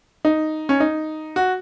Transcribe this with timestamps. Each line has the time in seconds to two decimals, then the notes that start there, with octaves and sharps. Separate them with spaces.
0.25 D#4
0.69 C#4
0.80 D#4
1.36 F#4